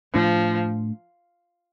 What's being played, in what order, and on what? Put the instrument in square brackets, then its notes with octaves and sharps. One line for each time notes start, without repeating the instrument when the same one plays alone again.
[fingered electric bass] A2 A3 D4 [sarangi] F3